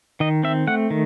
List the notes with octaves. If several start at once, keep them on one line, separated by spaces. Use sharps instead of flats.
D#3 D#5
C4 E5
A3 F#5
D#3